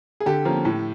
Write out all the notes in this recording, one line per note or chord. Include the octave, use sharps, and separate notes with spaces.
G#4
D3 G4 A4
F3 A#3 C#4
A2